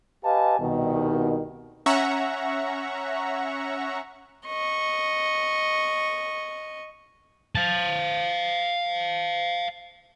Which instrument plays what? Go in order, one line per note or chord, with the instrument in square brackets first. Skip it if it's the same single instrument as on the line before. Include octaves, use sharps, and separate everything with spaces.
[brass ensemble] G4 B4 D#5 F5 G#5 A5
C2 B2 D#3
[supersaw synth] C#4 E5 F#5 A#5 C#6
[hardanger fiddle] D#5 C#6
[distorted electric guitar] F5 A5